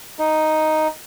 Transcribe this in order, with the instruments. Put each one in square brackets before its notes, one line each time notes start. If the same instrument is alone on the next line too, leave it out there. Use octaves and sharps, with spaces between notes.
[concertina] D#4